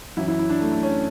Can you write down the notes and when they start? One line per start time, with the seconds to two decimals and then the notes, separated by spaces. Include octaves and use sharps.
0.17 F#2 E3 E4
0.28 E4
0.39 E4
0.49 D4
0.61 A3
0.71 A3
0.83 C#4